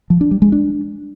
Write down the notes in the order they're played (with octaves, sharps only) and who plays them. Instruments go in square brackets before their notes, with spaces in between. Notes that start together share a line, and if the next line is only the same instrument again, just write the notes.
[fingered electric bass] F3
D4
G3
G#3
D4